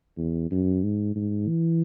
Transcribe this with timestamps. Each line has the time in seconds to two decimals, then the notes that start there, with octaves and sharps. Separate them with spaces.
0.17 E2
0.51 F#2
0.83 G#2
1.15 G#2
1.48 E3